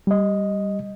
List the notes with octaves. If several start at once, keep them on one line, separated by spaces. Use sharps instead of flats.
G3 D#5